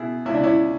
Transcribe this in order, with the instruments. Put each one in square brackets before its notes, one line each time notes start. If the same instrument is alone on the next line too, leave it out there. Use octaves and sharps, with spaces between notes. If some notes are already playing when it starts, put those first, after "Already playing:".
Already playing: [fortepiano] B2 E4 G#4
C#2 E4
D4
C#4 E4